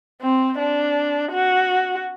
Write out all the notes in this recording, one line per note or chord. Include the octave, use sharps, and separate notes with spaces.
C4
D4
F#4